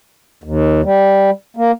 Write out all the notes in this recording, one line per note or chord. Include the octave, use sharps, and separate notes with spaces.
D#2
G3
A#3